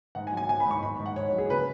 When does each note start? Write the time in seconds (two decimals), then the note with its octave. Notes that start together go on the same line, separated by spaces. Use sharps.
0.15 G#2 F#5
0.27 G#5
0.32 F#3
0.37 G#5
0.49 G#2 G#5
0.60 B5
0.66 G#2
0.71 C#6
0.83 G#2 B5
1.00 G#2
1.06 F#5
1.16 G#2 C#5
1.33 F#3
1.38 G#4
1.50 C#3 B4